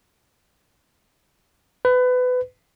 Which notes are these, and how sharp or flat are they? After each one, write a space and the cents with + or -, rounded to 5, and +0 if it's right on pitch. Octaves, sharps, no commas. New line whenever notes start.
B4 +25